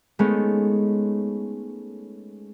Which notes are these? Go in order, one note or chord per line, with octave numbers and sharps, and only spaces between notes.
G#3 A3 B3 C#4 D#4